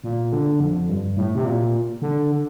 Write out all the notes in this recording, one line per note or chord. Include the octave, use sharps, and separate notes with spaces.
A#2
D3
F2
G2
A2
C3
A#2
D3